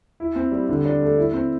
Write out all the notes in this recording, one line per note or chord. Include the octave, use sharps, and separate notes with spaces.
E4
C4
G3
D3
D4
A3
E4
C4